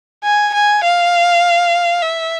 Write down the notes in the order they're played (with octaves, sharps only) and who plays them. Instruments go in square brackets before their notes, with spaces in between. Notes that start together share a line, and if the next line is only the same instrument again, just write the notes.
[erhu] G#5
G#5
F5
E5